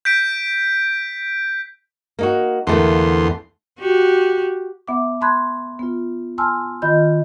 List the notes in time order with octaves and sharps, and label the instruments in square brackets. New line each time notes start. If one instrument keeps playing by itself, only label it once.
[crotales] G6 B6 D7
[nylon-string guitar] A#3 D#4 F#4
[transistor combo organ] E2 C6 [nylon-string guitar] D3 A3 A#3
[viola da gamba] F#4 G4
[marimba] B3 E5 F#5 D6
A5 B5 C6 F#6 G#6
B3 F4
G#5 A5 C6 E6 F6
D#3 F4 D#5 B5 G6